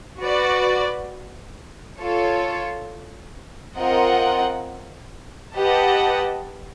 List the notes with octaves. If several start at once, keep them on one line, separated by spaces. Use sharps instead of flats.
F#4 B4 D5
F4 A4 C#5
C4 F4 A#4 D#5 F#5
G4 B4 D#5 F#5 A5